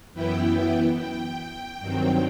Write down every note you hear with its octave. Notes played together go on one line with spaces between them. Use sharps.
F#2 E3 B3 E4 G5
G5
G2 D#3 F#3 C4